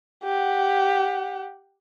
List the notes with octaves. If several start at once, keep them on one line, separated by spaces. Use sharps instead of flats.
G4 F#5